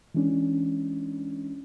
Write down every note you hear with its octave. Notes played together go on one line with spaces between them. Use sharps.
E3 G#3 C#4 D4